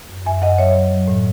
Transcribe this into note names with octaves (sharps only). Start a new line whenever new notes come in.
F#2
F#2 E5 G#5
F#2 D#5 F#5
F#3 C#5 E5
F#3
F#3
A2